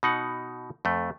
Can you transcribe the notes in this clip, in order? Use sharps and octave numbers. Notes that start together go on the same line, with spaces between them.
B2 D#4 F#5
F2 A3